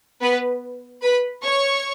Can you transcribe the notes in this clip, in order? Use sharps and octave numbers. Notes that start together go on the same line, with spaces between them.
B3 B4
B4 B5
C#5 C#6